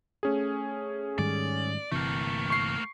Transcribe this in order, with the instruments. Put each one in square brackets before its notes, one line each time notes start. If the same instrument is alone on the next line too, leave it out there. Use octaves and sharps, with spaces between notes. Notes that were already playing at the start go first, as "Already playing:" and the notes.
[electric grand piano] A3 C#4 G#4
[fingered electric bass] G#2 D#3 G3 [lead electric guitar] D5
[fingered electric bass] G1 C3 E3 [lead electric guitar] A3 A#3
[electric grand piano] C#6 C7